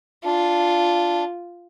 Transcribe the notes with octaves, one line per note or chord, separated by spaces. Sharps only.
D4 F4